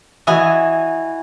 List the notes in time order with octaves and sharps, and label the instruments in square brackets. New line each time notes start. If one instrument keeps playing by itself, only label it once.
[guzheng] E3 E4 F#4 D#5 G#5